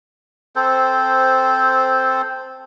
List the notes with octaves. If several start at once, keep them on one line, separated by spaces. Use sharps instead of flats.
C4 A4 C5